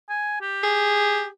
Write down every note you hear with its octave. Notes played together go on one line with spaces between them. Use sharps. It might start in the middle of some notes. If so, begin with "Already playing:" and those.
G#5
G4
G#4